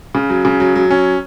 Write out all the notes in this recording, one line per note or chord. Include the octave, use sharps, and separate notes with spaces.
C#3
F#3
C#3
F#3
F#3
C#4